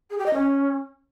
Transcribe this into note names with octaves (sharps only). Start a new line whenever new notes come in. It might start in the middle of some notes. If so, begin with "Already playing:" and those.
G#4
G4
D#5
C#4